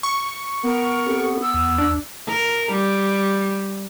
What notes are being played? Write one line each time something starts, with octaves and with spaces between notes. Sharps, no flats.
C#6
B3 A#4
C4 G4 A4
E6
E2
D4
A#4
G3